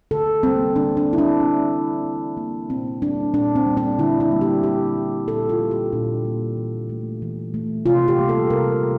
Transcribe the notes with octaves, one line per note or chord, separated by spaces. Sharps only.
D3 A4
G3 A#3 C4
D3 D4
D4
G3 A#3 E4
D4
E3 C4
A#3
E3
A#3
A#2 C4
G3 A#3 D4
A#2 D4
C4
G3 A#3
D4
D3 E4
E4
G3 A#3
G4
D3 G4
G3 A#3
A#2 A4
F4
G3 A#3
G4
A#2 D4
G3 A#3
E3
A3
E3
A3
C3 F4
G4
G3 A#3
A4
C3 A#4